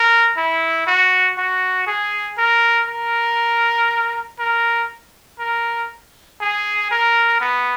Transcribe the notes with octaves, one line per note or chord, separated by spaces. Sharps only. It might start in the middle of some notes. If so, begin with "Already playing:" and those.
Already playing: A#4
E4
F#4
F#4
G#4
A#4
A#4
A#4
A#4
G#4
A#4
B3